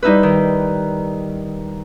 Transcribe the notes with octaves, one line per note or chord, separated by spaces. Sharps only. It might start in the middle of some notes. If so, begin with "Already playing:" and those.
G3 D#4 E4 B4
D#3